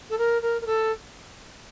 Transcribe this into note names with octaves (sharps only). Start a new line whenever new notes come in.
A4
A#4
A#4
A#4
A4